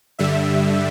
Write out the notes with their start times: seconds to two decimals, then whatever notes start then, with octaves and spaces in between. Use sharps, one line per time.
0.19 G2 D3 G3 E5